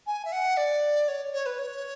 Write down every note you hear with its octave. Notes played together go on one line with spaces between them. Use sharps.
G#5
E5
F#5
D5
C#5
C#5
B4
C#5